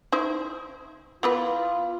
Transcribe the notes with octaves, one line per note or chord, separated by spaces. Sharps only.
D#4 E4 C5
E3 B3 F4 B4